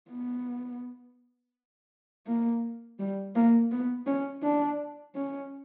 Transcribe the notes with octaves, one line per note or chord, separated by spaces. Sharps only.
B3
A#3
G3
A#3
B3
C#4
D4
C#4